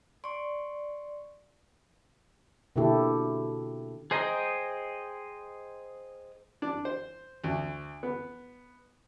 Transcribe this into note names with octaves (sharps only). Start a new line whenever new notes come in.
D5 C6 C#6
B2 D3 A#3 E4 G4 A4
G#4 C5 D#5 G5 A#5
D4
C5
D2
B3